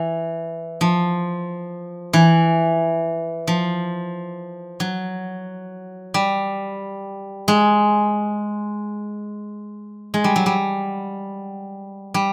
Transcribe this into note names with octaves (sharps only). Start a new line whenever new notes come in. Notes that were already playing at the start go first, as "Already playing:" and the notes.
Already playing: E3
F3
E3
F3
F#3
G3
G#3
G#3
G3
F#3
G3
G3